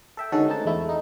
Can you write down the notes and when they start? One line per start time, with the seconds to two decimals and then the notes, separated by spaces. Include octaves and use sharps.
0.17 A4 E5 G5
0.32 D3 D#3 G#3 C#4 F#4 A4
0.48 A3 C4 D#4 A5
0.65 E2 G#3 A3 E4
0.86 G#3 D#4